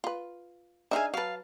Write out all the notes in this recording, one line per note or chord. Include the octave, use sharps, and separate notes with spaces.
F4 B4
D4 D#4 G#4 E5 F5 G#5
F#3 B4 F5 A5